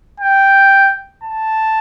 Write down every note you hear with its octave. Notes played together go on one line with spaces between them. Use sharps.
G5
A5